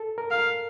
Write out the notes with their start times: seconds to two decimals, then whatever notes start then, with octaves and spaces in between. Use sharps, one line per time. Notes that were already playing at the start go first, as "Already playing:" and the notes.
Already playing: A4
0.18 A#4
0.31 F5